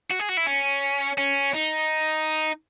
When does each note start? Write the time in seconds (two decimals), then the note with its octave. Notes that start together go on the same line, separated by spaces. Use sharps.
0.10 F#4
0.19 G#4
0.29 F#4
0.37 E4
0.46 C#4
1.18 C#4
1.54 D#4